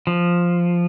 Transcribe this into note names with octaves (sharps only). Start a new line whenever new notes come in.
F3